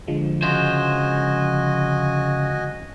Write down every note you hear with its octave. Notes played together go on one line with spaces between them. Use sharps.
D3 F3 G#3
C#3 F#4 C5 D#5 G#5